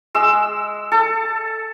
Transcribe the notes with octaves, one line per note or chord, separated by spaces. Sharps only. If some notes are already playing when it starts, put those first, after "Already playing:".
G#3 E6
A4